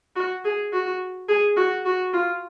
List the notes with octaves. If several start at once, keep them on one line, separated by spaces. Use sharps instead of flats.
F#4
G#4
F#4
G#4
F#4
F#4
F4